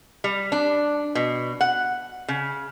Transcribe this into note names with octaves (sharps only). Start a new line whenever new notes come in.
G3
D4
B2
F#5
C#3